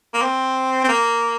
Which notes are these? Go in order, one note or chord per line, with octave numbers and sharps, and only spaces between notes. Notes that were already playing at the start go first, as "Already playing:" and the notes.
A#3
C4
C4
A#3